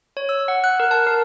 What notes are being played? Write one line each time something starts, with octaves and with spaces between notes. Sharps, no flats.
C#5
E6
F#5
F#6
A#4
A5
A#4